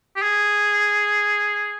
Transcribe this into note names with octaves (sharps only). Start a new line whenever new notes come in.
G4
G#4